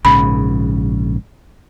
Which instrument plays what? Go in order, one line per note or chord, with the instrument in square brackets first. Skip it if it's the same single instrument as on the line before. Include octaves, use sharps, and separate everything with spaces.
[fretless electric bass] A#1 G#2 C#3 [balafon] B5